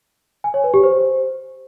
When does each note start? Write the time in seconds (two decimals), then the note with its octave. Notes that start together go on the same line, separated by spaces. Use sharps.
0.44 G#5
0.54 C#5
0.64 B4
0.74 G4
0.83 C5